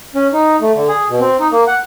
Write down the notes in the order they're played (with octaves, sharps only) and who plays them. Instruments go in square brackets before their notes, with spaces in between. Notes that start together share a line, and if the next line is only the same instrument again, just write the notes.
[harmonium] C#4
D#4
A3
D3
G#4
B2
C4
D#4
A#3
F#5